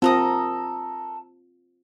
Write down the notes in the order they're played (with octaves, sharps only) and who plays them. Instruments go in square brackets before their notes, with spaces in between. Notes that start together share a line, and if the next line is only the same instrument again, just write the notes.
[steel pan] C4 F4 [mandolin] A4 A#4 D#6